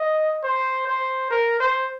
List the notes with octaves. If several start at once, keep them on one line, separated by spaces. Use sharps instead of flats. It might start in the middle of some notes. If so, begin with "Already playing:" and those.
Already playing: D#5
C5
C5
A#4
C5